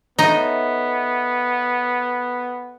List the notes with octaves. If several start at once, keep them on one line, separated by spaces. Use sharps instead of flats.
B3 D#4 A4 C#5 D#5 E5